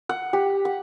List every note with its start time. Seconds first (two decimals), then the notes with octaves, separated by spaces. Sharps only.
0.09 F#5
0.33 G4
0.65 F#5